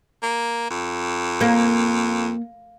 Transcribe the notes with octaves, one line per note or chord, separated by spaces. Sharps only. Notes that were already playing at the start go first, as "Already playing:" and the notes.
A#3
F2
A#3